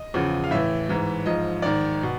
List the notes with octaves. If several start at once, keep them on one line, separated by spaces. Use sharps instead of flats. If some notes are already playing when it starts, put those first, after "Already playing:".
Already playing: D#5
E2 C#3 F3
F5
A2 E3 E5
G#2 E3
G#2 F3 D#5
G#2 D#3 D5
B2